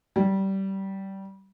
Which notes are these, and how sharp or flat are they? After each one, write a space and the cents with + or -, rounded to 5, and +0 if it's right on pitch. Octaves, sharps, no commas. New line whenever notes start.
G3 -20